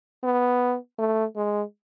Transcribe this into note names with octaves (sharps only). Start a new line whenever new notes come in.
B3
A3
G#3